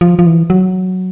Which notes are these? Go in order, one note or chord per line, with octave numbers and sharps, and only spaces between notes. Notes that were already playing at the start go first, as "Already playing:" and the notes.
F3
F3
E3
F#3